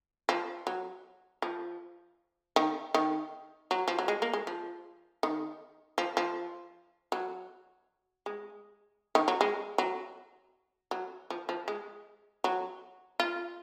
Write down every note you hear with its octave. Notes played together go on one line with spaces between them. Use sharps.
F3
F#3
F3
D#3
D#3
F#3
F3
F#3
G#3
A#3
G#3
F3
D#3
F3
F3
F#3
G#3
D#3
F#3
G#3
F#3
F#3
F3
F3
G#3
F#3
F4